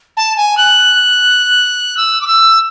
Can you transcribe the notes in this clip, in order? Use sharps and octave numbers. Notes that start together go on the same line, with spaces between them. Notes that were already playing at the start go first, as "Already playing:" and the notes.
A5
G#5
F#6
E6
D6
E6